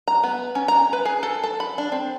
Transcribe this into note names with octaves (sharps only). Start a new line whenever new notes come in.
A#5
B3
C#4
A#5
B4
G#4
A4
A4
B5
D4
C4